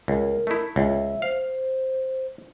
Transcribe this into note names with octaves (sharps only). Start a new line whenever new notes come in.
C#2 A#4
A3 D#4 E4
C#2 E5
C5 F5